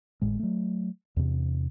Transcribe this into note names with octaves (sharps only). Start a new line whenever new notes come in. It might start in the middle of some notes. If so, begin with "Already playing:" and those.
G#1 A2 G#3
F#3 A3
E2 C3